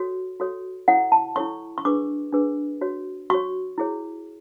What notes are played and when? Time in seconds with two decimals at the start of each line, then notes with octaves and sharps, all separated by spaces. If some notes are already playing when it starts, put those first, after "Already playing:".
Already playing: F#4 A4 C#5
0.40 F#4 A4 C#5
0.88 E4 A4 C#5 F#5
1.12 A5
1.36 E4 A4 C#5 C#6
1.78 C#6
1.85 D4 G#4 B4 D6
2.33 D4 G#4 B4
2.81 F#4 C#5
3.30 F#4 C#5 C#6
3.78 E4 G#4 C#5